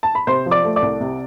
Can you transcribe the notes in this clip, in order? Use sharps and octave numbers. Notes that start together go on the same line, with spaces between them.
A5
B5
C3 C5 C6
F3
D5 D6
A3
D5 D6
C2
C3